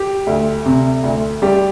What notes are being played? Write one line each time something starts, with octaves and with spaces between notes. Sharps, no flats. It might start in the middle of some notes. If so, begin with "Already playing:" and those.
Already playing: G4
D2
C3
D2
G3 G4